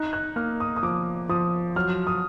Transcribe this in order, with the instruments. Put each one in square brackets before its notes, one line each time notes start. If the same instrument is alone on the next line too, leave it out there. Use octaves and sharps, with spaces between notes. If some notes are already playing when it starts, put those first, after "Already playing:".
Already playing: [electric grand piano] D#4 [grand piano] F#6
[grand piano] F#6
[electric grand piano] A#3 [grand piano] F6
[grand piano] D#6
D#6
[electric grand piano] F3 [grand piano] D6
[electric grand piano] F3 [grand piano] D#6
[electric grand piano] F#3 [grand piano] F6
[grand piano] D#6